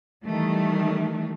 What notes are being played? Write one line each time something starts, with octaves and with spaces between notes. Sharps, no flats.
D#3 E3 G3 A3